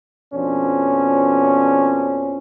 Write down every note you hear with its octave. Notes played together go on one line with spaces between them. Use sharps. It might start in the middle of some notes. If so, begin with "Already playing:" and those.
F2 B2 F3 C#4 D4